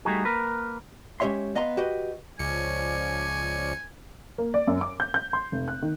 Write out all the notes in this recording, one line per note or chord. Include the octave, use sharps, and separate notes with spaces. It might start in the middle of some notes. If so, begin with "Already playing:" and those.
G3 A3 D#4 F#4 G#4
A#3 A#4 B4
G#3 C#4 G4 C#5 E5 C6
B3 D#5 F5 A#5 C6
F#4 G4 B4 D#5
C#2 F3 C#4 D5 G#5 C#7
A#3
D5
F#2
D6
G6
G6
C6
F1
F#6
D#3